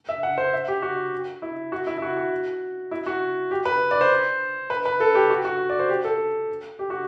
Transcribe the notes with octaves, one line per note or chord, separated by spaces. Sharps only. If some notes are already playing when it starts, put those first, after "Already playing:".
E5
F#5
C5
E5
G4
F#4
E4
F#4
E4
E4
F#4
F#4
E4
F#4
G4
B4
D5
C5
B4
B4
A4
G4
F#4
F#4
D5
C5
G4
A4
G4
F#4